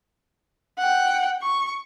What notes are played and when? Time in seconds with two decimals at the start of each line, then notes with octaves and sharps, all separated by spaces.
0.78 F#5 G5
1.42 C#6